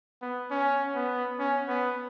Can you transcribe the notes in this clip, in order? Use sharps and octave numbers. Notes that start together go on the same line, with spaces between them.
B3
C#4
B3
C#4
B3